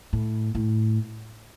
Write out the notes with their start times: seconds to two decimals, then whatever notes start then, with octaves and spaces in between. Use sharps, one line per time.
0.13 A2
0.55 A2